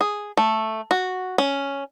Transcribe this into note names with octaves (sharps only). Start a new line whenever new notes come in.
G#4
A3
F#4
C#4